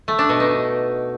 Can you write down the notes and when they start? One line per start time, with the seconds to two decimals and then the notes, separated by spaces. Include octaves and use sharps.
0.08 A3
0.19 D4
0.29 B2
0.40 D#4